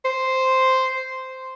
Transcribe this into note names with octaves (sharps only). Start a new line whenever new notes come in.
C5